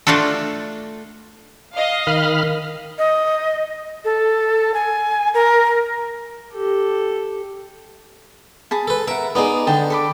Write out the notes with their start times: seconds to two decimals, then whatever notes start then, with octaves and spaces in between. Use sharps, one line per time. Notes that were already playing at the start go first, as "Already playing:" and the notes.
0.07 A3 D4 F4 F#4 A4
1.74 D#5 F5
2.07 D#3 B5 F6
2.98 D#5
4.05 A4
4.74 G#5
5.34 A#4
6.53 G4 A4
8.71 G#4 A5 B5
8.88 A4 B4
9.08 A#4 E5 F#5
9.35 B3 D#4 G#4 D5
9.67 D3 G5 A5
9.90 A4 B5 D6